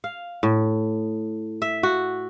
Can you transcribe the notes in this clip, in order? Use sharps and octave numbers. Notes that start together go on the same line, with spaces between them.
F5
A2
E5
F#4